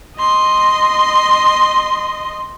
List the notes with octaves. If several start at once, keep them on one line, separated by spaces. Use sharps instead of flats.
D#5 C6